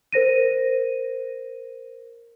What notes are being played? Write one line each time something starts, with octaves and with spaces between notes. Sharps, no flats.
A#4 C5 A#6 D#7